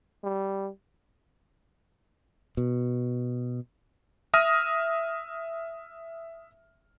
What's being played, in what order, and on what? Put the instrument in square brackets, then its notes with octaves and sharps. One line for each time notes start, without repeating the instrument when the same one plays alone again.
[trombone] G3
[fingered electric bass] B2
[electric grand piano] E5 D#6 F6 A#6 D#7